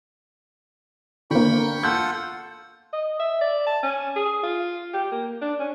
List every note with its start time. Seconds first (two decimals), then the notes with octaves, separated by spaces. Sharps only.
1.31 D3 A#3 G5 B5 C#6
1.83 F4 A4 F#5 G6
2.93 D#5
3.19 E5
3.41 D5
3.66 A5
3.82 C#4
4.16 G#4
4.43 F4
4.93 G4
5.12 A#3
5.41 D4
5.60 C#4